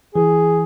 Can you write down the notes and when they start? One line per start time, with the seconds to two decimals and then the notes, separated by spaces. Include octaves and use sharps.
0.15 E3 G#4